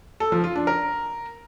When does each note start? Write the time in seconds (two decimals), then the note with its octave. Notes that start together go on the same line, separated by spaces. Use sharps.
0.20 A4
0.32 F3
0.44 F4
0.55 D4
0.67 A#4